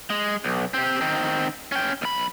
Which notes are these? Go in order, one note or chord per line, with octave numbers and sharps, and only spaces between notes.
G#3
B1
C4 G4
D#3 C4
C#4 G5
B1 B5